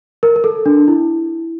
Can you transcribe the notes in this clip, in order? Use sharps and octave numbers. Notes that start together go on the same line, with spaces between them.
A#4
A#4
A4
D4
E4